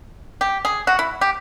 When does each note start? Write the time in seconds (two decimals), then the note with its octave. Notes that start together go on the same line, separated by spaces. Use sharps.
0.41 G4
0.65 G#4
0.87 F#4
0.99 E4
1.21 G4